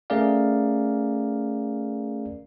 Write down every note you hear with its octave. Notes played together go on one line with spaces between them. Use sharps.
A3 C#4 G#4 A#4 D5 F5